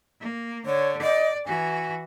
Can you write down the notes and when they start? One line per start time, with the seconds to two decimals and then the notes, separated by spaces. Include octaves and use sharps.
0.20 A#3
0.66 D3 C#5
1.02 D5 D#5
1.46 E3 F#4 G#5